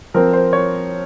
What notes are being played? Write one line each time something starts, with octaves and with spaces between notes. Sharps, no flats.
F3 C4 A#4
C5
C#5